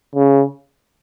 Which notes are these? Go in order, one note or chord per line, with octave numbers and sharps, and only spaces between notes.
C#3